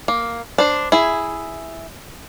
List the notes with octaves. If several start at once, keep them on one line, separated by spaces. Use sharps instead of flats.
A#3
D4 C5
E4 G#4